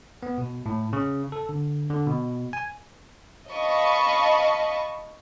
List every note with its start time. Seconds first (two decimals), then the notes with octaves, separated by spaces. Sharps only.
0.23 B3
0.38 B2
0.66 A2
0.93 C#3
1.32 A4
1.49 D3
1.90 D3
2.06 B2
2.53 G#5
3.50 D#5 F5 A5 B5 C#6